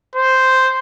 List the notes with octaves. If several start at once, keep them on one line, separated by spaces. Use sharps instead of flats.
C5